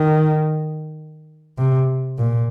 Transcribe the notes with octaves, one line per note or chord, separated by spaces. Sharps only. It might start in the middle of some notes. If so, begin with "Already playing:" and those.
Already playing: D#3
C3
A#2